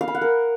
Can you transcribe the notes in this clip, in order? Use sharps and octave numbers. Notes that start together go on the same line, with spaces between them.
F5
B5
F#5
A#4